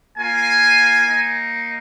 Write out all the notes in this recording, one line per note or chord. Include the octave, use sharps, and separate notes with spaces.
A#3 F4 G#5
A#3 D#4